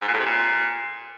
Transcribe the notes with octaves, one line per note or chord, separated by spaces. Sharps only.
G#2
A#2
A2
C3
A#2